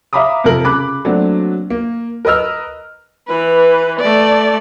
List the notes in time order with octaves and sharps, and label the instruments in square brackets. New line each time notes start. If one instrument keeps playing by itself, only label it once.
[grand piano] E5 F5 A#5 B5 D6 D#6
F2 C3 A4 A#4 F#7
C#3 B5 D6 F#6
F#3 A3 A#3 C4 D4 F#4
A#3
A#4 B4 D#5 E6 F6
[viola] E3 B4
A3 D5